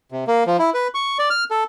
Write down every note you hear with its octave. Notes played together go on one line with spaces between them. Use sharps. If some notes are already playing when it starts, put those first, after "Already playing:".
C3
A#3
F3
E4
B4
C#6
D5
F6
A4